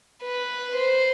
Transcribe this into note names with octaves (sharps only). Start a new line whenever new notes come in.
B4
C5